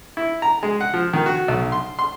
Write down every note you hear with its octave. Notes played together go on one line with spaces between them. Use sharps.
E4
A#5
G#3
F#5
F3
D#3
F#4
B1
C6
C6